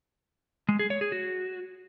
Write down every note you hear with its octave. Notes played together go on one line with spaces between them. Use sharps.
G#3
G#4
C#5
G#4
F#4